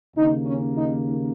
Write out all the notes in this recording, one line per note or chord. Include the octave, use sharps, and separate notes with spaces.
D#2 C#3 A#3 D#4
C#4
D#4